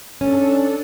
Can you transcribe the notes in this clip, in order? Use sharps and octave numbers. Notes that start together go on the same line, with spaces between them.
C#4 D4 A4